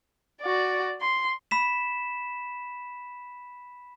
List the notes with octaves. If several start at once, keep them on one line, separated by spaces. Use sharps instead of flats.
F#4 D5
C6
B5 B6 E7